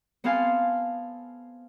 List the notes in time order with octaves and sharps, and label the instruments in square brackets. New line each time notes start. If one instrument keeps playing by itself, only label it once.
[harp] B3 C4 A4 F5 G#5 A5